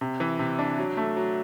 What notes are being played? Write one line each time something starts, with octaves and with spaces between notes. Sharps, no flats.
C3
E3
C3
D4
F#3
A3
F#3